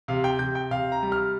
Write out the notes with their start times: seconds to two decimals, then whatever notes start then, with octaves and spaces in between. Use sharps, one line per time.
0.08 C3 F5
0.24 G5
0.39 C3 G6
0.55 G5
0.71 C3 F5
0.92 A#5
1.03 G3
1.12 F6